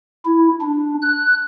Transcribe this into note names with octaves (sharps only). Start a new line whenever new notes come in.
E4
D4
F#6